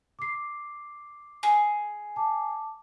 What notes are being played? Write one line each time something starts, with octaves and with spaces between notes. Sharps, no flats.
D6 C7
G#4
A5 D6